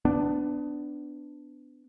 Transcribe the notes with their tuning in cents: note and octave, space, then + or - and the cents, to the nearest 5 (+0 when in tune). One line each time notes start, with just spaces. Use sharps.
B3 +25 D4 +0